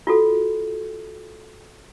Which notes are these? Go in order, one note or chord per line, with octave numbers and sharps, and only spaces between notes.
F4 F#4 A4